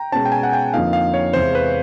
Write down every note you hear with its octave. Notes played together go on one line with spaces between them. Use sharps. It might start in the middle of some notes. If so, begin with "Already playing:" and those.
Already playing: G5 A#5
B2 G#3 C#4 A5
G5
G#5
F#5
G5
F2 D3 F3 A#3 D#4 F5
F5
C#5
E2 C3 E3 G#3 C5
B4